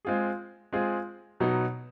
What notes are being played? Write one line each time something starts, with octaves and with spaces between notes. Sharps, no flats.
G#3 C4 F4 G#4
G#3 C4 F4 G#4
B2 F#3 B3 D#4